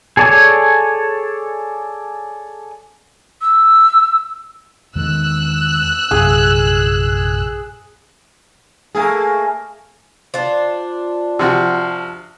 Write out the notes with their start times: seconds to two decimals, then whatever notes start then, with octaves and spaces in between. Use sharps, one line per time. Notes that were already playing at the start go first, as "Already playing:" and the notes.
0.17 G#4 A4 C#5 D5 G#5
3.41 E6
4.95 E2 D#3 G#3 E6 F#6
6.11 A#1 F#2 C3 G#4
8.95 A3 A#3 G#4
10.34 D4 F4 C5
11.39 C3 F3 F#4